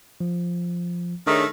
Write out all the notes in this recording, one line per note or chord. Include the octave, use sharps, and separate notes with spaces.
F3
D#3 A3 D4 G#4 C#5